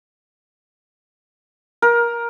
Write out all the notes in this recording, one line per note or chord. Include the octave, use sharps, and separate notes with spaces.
A#4